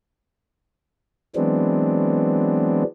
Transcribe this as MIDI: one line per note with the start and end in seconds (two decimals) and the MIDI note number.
1.36 2.83 52
1.36 2.83 54
1.36 2.83 56
1.36 2.83 59
1.36 2.83 60
1.36 2.83 62